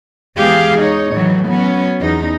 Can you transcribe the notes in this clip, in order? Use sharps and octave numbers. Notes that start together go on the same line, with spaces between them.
E2 G#3 G4 G#4 F5
D#4 C#5
A2 D#3 E3 F#3
F#3 B3 C#4
E2 D#4